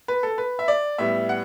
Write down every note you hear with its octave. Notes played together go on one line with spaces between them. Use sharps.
B4
A4
B4
E5
D5
A2 G3 B3 E5
F#5